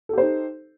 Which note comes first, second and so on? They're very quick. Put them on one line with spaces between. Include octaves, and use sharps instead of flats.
A4 G4 C5 D#4